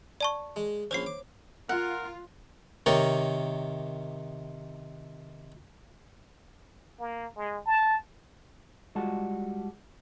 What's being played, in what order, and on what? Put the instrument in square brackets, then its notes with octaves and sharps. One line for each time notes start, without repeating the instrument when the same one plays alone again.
[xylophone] D5 A5 C#6
[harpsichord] G#3
[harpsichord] A#1 C#4 [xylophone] C5 C#5 C7
[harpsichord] D6
[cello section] F4 [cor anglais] A#4 [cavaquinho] F#5
[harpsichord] C3 D#3 A#4 C#5 D5 G5
[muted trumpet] A#3
G#3
A5
[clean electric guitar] G3 G#3 F4 F#4 G#4 A5